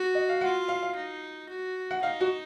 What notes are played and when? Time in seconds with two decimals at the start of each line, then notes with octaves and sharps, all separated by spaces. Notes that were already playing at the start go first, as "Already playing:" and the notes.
Already playing: F#4
0.15 D#5
0.29 F5
0.41 F4 F#5
0.68 F5
0.83 F5
0.96 D#4
1.49 F#4
1.91 F#5
2.02 D#4 F5
2.21 F#4